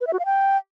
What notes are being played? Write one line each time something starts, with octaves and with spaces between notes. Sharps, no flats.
B4
E5
F#4
F5
G5